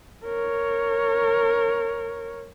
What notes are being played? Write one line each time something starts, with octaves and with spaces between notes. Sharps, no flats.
A#4 C#5